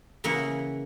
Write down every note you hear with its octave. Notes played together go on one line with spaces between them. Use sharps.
C#3 E3 A#3 G#4 F#5